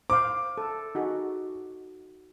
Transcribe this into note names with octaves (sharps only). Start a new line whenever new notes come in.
C5 F5 D6
A4
D#4 F#4 G#4